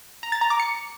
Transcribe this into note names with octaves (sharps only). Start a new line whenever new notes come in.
A#5
A6
A#5
D6
C#7